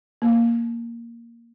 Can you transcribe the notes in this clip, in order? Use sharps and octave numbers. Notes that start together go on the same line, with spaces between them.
A#3